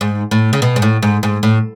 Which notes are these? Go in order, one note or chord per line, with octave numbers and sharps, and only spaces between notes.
G#2
A2
C#3
B2
G#2
A2
G#2
G#2
A2